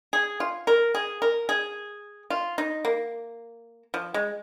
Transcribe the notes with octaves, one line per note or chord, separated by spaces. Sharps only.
G#4
F4
A#4
G#4
A#4
G#4
F4
D#4
A#3
F3
G#3